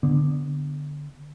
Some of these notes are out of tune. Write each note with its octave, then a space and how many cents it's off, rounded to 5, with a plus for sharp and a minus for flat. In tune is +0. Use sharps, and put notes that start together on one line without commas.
D3 +0 B3 +0